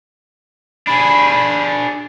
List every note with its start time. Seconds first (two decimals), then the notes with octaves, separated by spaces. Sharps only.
0.87 D4 G#4 B5